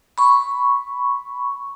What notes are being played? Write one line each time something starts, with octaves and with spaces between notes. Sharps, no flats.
B5 C#6